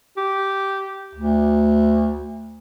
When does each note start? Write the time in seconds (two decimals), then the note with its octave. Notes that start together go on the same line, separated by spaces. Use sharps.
0.17 G4
1.15 D2